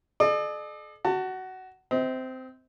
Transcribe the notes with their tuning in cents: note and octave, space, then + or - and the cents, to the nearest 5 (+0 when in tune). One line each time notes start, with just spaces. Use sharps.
A4 -45 D5 +45
F#4 +15 A5 +30
C4 -15 D#5 +45